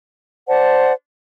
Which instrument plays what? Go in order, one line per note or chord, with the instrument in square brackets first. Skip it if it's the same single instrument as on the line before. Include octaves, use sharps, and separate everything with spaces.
[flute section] C5 D5 F#5 A5